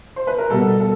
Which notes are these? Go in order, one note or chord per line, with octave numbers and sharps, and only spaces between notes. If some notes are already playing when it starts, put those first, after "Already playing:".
C5
B4
A#4
B2 G3 A4
A4